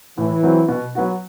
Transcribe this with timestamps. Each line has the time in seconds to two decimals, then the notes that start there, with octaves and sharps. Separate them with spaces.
0.17 A2 E3
0.43 F#3 C4
0.68 B2
0.95 F#3 B3 F#4